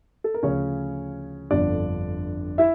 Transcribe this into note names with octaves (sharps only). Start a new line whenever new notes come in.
A4
A#4
D2 C#3 F3 C#4 C#5
G1 F2 D3 F3 D4 D5
E4 E5